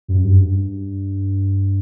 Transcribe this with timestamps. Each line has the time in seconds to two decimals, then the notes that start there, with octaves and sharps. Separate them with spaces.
0.08 F#2
0.24 G2